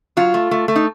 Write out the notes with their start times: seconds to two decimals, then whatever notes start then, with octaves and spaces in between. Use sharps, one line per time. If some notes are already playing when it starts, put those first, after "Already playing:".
0.17 F#3 F4
0.34 A3
0.51 A3
0.68 A3
0.76 D#4